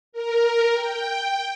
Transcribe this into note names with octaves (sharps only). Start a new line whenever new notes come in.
A#4
G5